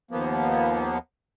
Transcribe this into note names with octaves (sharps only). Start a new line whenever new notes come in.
D#2 F3 A#3 B3